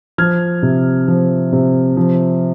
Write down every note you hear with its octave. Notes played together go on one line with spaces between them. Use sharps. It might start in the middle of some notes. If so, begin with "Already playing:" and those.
F3 F6 G#6
C3
F3
C3
F3